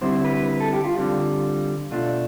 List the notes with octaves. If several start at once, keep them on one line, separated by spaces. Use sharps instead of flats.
D3 G3 C4 E4 C5
B4
B4
A4
G4
F4
D3 G3 C4 F4
B2 A3 D4 F4